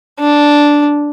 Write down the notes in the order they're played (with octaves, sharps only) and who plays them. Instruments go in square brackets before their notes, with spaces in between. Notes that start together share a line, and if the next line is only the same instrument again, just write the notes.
[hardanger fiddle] D4